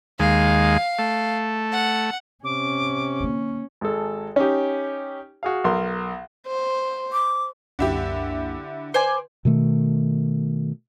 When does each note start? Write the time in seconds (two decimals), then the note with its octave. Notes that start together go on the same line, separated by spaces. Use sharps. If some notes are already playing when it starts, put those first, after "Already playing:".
0.20 D#2 G#3 F5
0.99 A3
1.72 F#5
2.44 C3 C#4 D6
3.20 D3 A#3
3.81 G#1 G#3 A4
4.36 C#4 D#4 G4
5.43 F#4 G#4 F5
5.64 B1 A#4 C6
6.47 C5
7.12 D6
7.79 C2 F#2 D3 A#3 E4 G4
8.94 B4 C5 D5 G#5
9.45 B2 D#3 A3